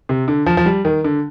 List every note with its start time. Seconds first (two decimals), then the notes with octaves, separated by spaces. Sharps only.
0.09 C3
0.28 D3
0.46 F3
0.57 F3
0.66 G3
0.85 D#3
1.04 D3